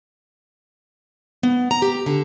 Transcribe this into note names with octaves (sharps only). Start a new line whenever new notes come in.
B3
A#5
G4
D3